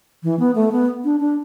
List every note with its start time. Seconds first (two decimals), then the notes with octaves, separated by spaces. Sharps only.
0.23 E3
0.39 B3
0.55 A3
0.72 B3
1.04 D4
1.20 D4